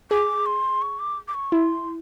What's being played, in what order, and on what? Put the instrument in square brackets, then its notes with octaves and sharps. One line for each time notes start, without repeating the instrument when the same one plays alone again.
[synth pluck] G#4 [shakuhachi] D6
[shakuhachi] C6
C#6
D6
D6
C#6
[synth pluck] E4 [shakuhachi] C6